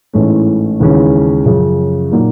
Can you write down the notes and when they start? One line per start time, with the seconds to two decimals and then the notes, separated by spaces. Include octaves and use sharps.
0.13 A1 G#2 E3 A3 C#4
0.80 D#2 C#3 E3 G#3 C#4
1.46 F#2 C#3 F3
2.12 A#2 F#3 A#3 D#4 F#4